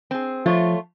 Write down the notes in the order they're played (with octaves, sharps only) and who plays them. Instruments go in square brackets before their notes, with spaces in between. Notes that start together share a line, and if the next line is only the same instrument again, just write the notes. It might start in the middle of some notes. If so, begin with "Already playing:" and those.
[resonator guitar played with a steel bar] C4 G#4
[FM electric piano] F3 [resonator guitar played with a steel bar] A3 F4 C#5